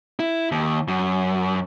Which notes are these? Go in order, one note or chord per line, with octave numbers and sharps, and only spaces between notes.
E4
D#2
F#2